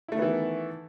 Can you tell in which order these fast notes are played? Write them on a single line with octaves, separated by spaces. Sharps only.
E4 A3 D#3 B3 E3